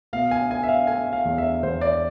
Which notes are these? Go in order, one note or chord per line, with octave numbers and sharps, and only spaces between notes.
B2 F5
G#5
A3 G#5
E5
F5
A3 G#5
F5
E2
E5
E2 C5
D5